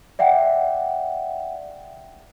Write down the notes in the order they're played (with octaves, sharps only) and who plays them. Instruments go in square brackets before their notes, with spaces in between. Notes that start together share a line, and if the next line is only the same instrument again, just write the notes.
[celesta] D5 E5 F#5 G5